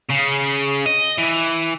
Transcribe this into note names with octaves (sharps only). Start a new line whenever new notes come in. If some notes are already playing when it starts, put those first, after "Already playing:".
C#3
D#5
E3